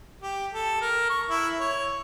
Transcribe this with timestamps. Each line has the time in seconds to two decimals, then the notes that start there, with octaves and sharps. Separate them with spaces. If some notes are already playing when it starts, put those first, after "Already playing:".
0.22 G4
0.54 A4
0.81 A#4
1.10 C#6
1.30 E4
1.60 C#5